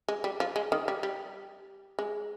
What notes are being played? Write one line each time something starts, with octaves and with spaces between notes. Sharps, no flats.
G#3
G3
F3
G#3
D#3
G3
G3
G#3